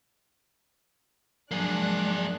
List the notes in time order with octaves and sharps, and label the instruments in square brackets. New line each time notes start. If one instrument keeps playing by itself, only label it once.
[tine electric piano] F3 F#3 [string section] G#3 D4 F#6 [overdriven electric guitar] A#3 G#4